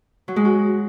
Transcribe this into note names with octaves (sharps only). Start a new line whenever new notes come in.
F#3
G#3
F#4